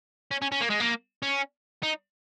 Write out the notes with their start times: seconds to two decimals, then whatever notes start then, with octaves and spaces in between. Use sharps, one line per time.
0.31 C#4
0.42 C#4
0.52 C#4
0.61 A#3
0.70 G#3
0.80 A#3
1.22 C#4
1.83 D#4